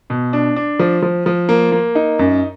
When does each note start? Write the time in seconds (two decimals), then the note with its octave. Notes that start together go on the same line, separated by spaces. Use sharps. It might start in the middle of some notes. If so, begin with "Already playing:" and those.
0.10 B2
0.33 D4
0.56 D4
0.79 F3
1.02 F3
1.26 F3
1.49 A#3
1.72 A#3
1.95 D#4
2.19 F#2